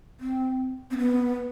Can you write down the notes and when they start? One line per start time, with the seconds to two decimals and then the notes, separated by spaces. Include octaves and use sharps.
0.20 C4
0.91 C4
0.98 B3